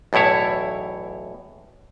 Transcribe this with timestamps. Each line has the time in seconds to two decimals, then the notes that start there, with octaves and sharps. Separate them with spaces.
0.13 B1 E2 A2 E4 C#5